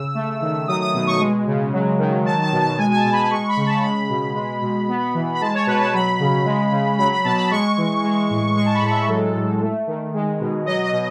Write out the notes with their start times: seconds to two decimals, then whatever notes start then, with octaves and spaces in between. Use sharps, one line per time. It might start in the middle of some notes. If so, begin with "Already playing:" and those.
Already playing: C#3 E6
0.15 A3
0.41 D#3
0.68 F#3 D#6
0.81 D#6
0.94 B2
1.07 C#6
1.20 G#3
1.46 C#3
1.72 F#3
1.99 D#3
2.25 F#3 A5
2.43 A5
2.52 B2
2.60 A5
2.78 G#3 G#5
2.90 G#5
2.95 A5
3.04 B2
3.12 B5
3.31 G#3 C#6
3.48 B5
3.57 C#3
3.66 A5
3.83 G#3 B5
4.09 B2
4.35 G#3
4.62 B2
4.88 B3
5.14 E3
5.35 B5
5.41 G#3 A5
5.54 C#5
5.67 B2 B4
5.80 A5
5.93 F#3 B5
6.20 C#3
6.45 G#3
6.72 C#3
6.98 F#3 B5
7.11 B5
7.24 B2 A5
7.37 B5
7.51 G#3 C#6
7.77 E3
8.04 G#3
8.30 A2
8.56 G#3 C#6
8.66 A5
8.74 B5
8.82 A2
8.91 E5
9.08 F#3 A4
9.35 A2
9.61 A3
9.87 D#3
10.14 G#3
10.40 B2
10.66 F#3 D#5
10.84 D#5
10.93 B2